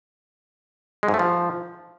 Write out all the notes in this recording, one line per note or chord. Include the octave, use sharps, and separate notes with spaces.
G#3
G#2
A3
F3